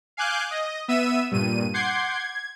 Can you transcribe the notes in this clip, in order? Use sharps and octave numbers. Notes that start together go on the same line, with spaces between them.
F5 G#5 D6 F#6 G6
D#5
B3 E5 E6 D#7
G2 A#2 D#7
F#5 C6 D6 G6 G#6 C7
G#6